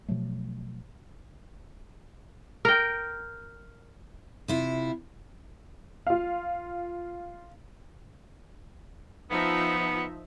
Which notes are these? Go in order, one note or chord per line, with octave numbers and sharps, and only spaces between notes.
B2 F3 F#3 A3
A#4 G5
C3 E4 F4
F4 F5
F3 B3 D#4 E5